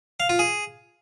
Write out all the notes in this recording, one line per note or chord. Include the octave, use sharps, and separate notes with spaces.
F5
F4
G#4